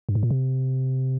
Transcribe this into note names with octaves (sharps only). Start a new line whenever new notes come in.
G2
G#2
A#2
C3